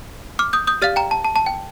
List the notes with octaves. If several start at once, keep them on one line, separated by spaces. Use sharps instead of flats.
D6 F6
D#6 G6
D#6 G6
G4 D5 F5 F6 A6
G5 A#5
A5
A5
A5
G5